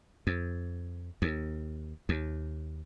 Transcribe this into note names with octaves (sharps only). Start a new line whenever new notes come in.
F2
D#2
D#2